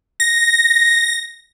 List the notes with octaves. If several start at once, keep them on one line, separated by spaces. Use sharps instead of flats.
A#6